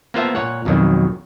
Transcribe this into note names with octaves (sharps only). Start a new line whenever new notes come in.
A#3 B3 F4 C5 E5 A5
A#2 C#5 F#5
B1 F2 B2 D#3 F#3